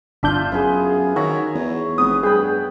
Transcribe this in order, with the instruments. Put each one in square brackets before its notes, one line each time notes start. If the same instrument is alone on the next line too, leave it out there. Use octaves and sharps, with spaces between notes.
[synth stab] G1 D4 G6 [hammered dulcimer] F4 E5
[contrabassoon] F#2 [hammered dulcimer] B3 G#4
[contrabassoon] D#3 [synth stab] F#4 [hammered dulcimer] C#5 E5 A#5
[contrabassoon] E2
[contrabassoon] F1 [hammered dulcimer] B3 [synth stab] D#6
[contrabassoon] G2 [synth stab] G#4 [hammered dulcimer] B4 G5